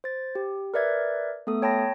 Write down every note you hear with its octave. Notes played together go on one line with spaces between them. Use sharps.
C5 A6
G4
A#4 B4 D5 E5 G#6
A3 B3 A4 D#6
C#5 G5 A5 B5 A#6